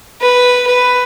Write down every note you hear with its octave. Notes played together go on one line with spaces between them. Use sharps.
B4
B4